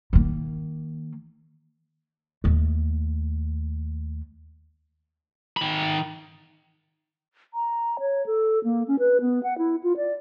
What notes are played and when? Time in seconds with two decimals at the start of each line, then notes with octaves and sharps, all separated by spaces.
0.13 D#3 A#3
2.44 D#2 A3
5.57 D#3 B5
7.54 A#5
8.00 C#5
8.26 A4
8.64 A#3
8.88 C#4
8.99 B4
9.21 B3
9.43 F#5
9.58 E4
9.83 F4
9.97 D5